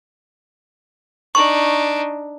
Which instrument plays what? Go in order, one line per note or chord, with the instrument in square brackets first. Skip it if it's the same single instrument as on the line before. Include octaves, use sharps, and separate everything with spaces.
[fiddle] D4 D#4 [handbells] C#6